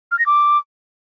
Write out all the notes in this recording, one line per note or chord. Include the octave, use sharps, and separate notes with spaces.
F6
A#6
D6